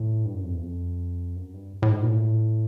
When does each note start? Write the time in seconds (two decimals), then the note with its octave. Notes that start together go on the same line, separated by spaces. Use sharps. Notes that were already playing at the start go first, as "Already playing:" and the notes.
Already playing: A2
0.25 G2
0.34 F#2
0.43 F2
0.54 E2
0.63 F2
1.36 F#2
1.54 G2
1.82 A2
1.90 G#2
2.02 A#2
2.09 A2